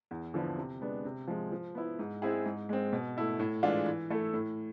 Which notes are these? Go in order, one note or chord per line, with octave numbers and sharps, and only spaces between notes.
E2
D3 F3 B3 E4
C3
G#3 B3 D4
C3
F3 G#3
F3
B3 E4
G#2
G#3 C4 E4 G#4
G#2
G#3 C4
B2
A3 E4 A4
A2
E3 G#3 D4 F4
E3
A3 E4 A4
A2